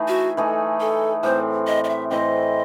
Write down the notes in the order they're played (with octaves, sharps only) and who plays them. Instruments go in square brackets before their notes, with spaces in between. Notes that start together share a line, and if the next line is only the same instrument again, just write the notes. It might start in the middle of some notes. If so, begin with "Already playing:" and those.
Already playing: [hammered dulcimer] E3 A3 D#4 G#4
[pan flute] F#4
[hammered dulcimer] E3 A3 D#4 G#4
[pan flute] A4
[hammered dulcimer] A2 E3 C4 [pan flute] C5
[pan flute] D#5
D#5
E5
[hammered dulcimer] A2 E3 C4 [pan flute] D#5